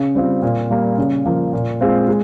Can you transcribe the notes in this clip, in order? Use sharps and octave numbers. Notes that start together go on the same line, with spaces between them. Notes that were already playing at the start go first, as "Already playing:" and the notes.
Already playing: C#3
G3 C4 F4
A#2
G3 A#3
C#3
F3 A#3
A#2
G#3 C4 F4 C5
G#3